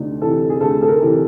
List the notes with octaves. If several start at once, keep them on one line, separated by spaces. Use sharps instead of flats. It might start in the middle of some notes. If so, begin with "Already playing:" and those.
Already playing: D2 C3 D4 D#4
C3 E3 A4
G#4
D2 A4
A4
A#4
C3 E3